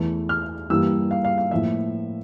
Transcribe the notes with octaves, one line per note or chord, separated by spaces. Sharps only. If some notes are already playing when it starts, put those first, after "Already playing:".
Already playing: E2 E3 A3
F6
G2 E3 G3 A#3 E6
F5
F5
F5
A2 F3 A#3 E5